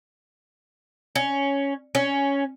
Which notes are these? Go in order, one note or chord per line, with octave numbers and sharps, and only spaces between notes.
C#4
C#4